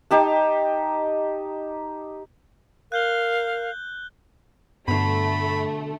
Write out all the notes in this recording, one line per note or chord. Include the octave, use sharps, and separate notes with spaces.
D#4 G4 A5
A#4 F5 F#6 G6 G7
G2 B2 D3 A3 B5